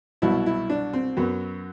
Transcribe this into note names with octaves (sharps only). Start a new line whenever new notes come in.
C2 B2 F#3 E4
E4
D4
C4
F#2 F#3 B3